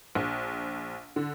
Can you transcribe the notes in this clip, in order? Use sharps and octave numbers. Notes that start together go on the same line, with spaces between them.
A#1
D3